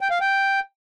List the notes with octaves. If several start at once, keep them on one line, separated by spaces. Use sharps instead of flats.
G5
F5
G5